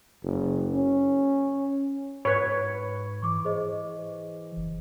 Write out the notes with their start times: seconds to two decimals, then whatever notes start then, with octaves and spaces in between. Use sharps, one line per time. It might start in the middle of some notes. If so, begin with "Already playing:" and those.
0.23 F#1
0.75 C#4
2.25 G#2 B4 C#5 B5
3.22 E3 C#6 D6
3.45 G#4 C5 D#5
4.56 F#1